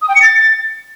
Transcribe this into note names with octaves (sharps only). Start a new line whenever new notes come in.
D#6
G5
C#7
A6